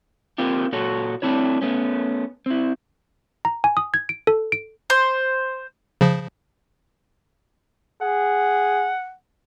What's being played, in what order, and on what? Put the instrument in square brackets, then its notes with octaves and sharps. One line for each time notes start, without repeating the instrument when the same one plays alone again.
[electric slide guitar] A#3 C4 F4 G4
A#2 F#4 A4 C#5
A3 C4 D4 E4 C#5
A3 B3 C#4
C4 E4
[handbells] A#5
G#5
D#6
G#6
D7
A4
D7
[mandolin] C5
[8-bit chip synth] C#3 F3
[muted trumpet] G#4 [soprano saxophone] F#5